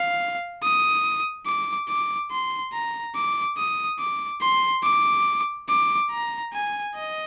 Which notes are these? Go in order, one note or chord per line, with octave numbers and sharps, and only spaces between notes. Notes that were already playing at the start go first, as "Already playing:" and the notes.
Already playing: F5
D#6
D6
D6
C6
A#5
D6
D#6
D6
C6
D6
D6
A#5
G#5
D#5